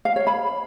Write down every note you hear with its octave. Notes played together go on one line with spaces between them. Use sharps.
F5
C#5
B5